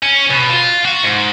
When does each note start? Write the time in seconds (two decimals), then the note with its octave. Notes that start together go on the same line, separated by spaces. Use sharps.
0.03 C#4
0.30 B2
0.50 F4
0.85 F#4
1.03 G#2